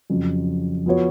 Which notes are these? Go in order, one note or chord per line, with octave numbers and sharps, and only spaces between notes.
F2 C#3 F#3
F3 B3 F#4 C#5